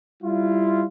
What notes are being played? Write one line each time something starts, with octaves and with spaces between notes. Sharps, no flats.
G3 E4 F4